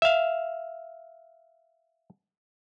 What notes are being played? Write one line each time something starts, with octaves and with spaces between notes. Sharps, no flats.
E5 F5